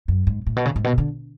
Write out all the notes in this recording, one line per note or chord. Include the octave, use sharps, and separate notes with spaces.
F#2
G#2
A2
B2
C#3
G#2
B2
D3